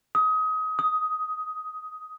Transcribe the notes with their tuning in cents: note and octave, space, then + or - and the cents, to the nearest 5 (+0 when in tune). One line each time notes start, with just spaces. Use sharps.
D#6 +25
D#6 +10